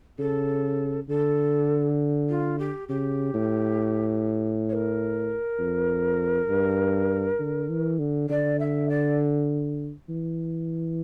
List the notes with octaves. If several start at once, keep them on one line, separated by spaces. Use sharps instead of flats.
C#3 A4
D3 A4
F4
G4
C#3 G4
A2
C#5
A#4
F2
G2
D3
E3
D3
D3 D5
E5
D5
E3